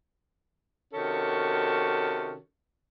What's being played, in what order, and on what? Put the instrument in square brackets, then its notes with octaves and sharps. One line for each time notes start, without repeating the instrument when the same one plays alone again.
[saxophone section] C3 D#3 C#4 F#4 A4